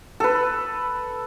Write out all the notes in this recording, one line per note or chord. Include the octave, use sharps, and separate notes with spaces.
A4 B4